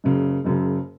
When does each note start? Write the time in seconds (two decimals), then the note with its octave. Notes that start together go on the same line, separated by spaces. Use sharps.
0.04 F#1 F#2 C#3
0.45 F#1 F#2 C#3